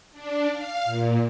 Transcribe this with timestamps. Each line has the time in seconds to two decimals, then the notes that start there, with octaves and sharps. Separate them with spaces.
0.12 D4
0.52 F5
0.85 A#2